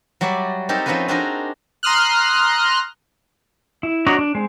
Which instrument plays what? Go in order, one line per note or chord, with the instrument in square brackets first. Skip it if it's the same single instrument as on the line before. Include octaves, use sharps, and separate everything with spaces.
[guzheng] F#3 G3 F#4 D5 E5
C4 D#4 G4 A4 A#4
F3 C4 C#4 D#4 F#4 B4
C4 D4 D#4 F#4 G#4 A#4
[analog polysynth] A#5 C6 D#6 F6 F#6
[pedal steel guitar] E4
D4 F#4 C#5 D#5 A#5
D4
G#3 C4